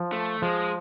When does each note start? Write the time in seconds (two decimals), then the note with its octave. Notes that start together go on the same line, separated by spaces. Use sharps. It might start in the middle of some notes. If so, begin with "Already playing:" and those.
Already playing: F3
0.12 A3
0.42 F3 G#3